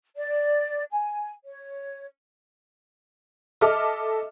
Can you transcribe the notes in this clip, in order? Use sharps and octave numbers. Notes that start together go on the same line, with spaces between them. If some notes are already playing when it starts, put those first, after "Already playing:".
D5
G#5
C#5
A4 D#5 E5 D6 F6